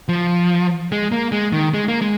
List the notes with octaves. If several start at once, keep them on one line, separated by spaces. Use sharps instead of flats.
F3
G#3
A#3
G#3
D#3
G#3
A#3
G#3